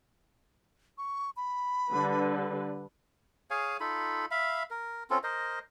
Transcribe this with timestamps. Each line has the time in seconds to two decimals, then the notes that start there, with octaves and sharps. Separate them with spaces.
0.98 C#6
1.36 B5
1.90 D3 G3 B4
3.50 G#4 C#5 F5 G#5
3.80 D#4 F4 A4 B5
4.31 E5 F5 B5
4.71 A#4
5.10 C4 C#4 F4 A4
5.24 A#4 C5 D#5